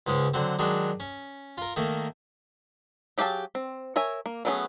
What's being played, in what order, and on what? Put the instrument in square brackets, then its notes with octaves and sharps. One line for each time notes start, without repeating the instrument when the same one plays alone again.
[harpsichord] C#2 G#2 G#3 C#4
D3 F#3 C4
D#3 F#3 G#3 D4
C#4
F4 A#4
D#3 A3 A#3
[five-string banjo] F#3 G4 G#4 F5 A5
C4
A#4 C#5 E5 G#5
A#3
F#3 A3 B3 C#4 G#4